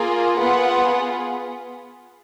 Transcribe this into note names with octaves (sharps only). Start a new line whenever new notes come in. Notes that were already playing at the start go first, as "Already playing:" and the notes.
Already playing: A#3 F4 G#4
B3 F4 G#4 F#5